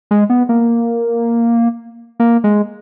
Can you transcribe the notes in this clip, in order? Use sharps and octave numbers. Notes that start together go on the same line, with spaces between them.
G#3
B3
A#3
A#3
G#3